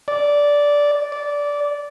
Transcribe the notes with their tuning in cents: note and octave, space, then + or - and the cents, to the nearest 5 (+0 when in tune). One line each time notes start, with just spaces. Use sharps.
D5 -10
D5 -15